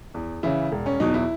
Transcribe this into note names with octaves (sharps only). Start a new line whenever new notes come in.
E2
C#3 E3 E4
E1
C#4
E2 B2 F#3 D#4
E4